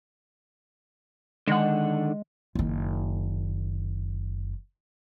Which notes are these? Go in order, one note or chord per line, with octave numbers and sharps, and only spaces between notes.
D3 D#3 G#3 F#5
F#1 D#3